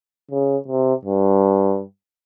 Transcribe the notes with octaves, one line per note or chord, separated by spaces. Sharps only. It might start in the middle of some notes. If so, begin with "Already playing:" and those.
C#3
C3
G2